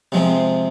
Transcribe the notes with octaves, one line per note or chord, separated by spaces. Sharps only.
C3 F3 G#3 C4